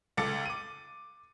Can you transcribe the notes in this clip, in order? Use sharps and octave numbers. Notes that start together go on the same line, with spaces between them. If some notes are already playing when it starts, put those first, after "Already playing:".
C#2 A4 D6 A6 C#7
D6 D#7